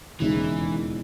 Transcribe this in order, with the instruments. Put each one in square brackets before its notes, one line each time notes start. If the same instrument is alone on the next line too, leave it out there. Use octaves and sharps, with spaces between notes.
[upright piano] E1 D#2 C#3 G#3 D#4 [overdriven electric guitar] E3